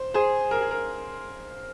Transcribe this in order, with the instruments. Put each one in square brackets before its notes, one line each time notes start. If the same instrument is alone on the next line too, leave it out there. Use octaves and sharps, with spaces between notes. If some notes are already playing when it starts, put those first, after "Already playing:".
Already playing: [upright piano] C5
[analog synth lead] G#4 [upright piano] C5
[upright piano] A#4
G#4
A#4